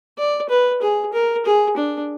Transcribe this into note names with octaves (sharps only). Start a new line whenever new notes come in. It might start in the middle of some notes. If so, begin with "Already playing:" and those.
D5
B4
G#4
A#4
G#4
D4